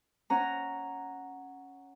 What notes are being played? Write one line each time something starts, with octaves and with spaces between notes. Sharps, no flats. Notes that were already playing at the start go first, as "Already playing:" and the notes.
C#4 F#5 A#5